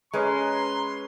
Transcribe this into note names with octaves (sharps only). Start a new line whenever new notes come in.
G#3 C#4 B4 A#5 C6